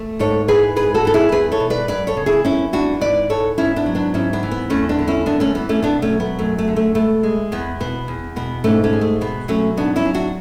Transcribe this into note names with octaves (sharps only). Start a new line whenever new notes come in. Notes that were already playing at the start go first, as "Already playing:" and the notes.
Already playing: A3
G#2 A4 C#5
E3 G#4 B4
G#2 G#4 B4
F#4 A4
E3 A4
E4 G#4
E2 G#4 B4
A4 C#5
B2
B4 D5
F#2 B4 D5
A4 C#5
C#3
E4 G#4
F#2 C#4 E4
E3 D4 F#4
G#2 B4 D5
E3 A4 C#5
G#2 C#4 E4
B3 D4
F#3
B3 D4
G#2 C#4 E4
B3 D4
E3
B3
E2 A3 C#4
B3 D4
D3
C#4 E4
F#2 B3 D4
A3 C#4
E3 B3
A3 C#4
B2 B3 D4
A3 C#4
F#3
B3
F#2 A3
A3
D3
A3
B2 A3
G#3
E2 B3
B2 B3
E2
B2 B3
G#2 A3 C#4
A3 C#4
G#3
A3
B2 B3
F#3 A3 C#4
G#2 B3 D4
C#4 E4
F#3
D4 F#4